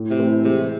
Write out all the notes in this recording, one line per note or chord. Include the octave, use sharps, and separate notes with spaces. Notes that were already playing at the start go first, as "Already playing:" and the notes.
Already playing: A2
C3
E3 A3 C4
C3 G#3